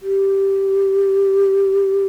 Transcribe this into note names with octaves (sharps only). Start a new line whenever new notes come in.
G4